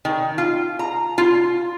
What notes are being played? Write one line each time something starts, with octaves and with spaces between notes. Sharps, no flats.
D#3
F4
A#5
F4